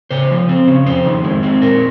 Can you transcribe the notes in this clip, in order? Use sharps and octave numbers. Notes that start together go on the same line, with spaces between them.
C#3 C5
F3
C4
C#3
F2 C5
D#3
G#3
C4
A#2 A#4